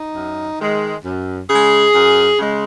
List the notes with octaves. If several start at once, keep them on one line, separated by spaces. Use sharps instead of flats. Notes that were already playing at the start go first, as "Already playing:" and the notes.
Already playing: D#4
F#2
D#3 G#3
F#2
C#3 G#3 G#4
F#2
C#3 G#3